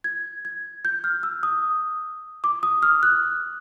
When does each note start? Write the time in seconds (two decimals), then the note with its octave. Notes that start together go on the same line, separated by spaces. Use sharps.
0.04 G#6
0.45 G#6
0.85 G6
1.04 F6
1.23 E6
1.43 D#6
2.44 D6
2.63 D#6
2.83 F6
3.03 F#6